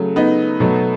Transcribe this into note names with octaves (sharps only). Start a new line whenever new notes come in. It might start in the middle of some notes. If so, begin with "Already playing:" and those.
Already playing: C#3 F#3 A3
B3 D#4
B2 F#3 A3